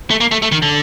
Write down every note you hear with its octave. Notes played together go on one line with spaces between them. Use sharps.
A3
A#3
A3
A3
D#3
D3